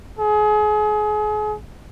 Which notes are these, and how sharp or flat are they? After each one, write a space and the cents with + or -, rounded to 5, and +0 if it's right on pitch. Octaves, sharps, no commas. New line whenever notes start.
G#4 +30